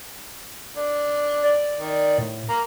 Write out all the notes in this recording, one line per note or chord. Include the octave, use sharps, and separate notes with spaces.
D4
D5
D#3
A2
A#3 A#5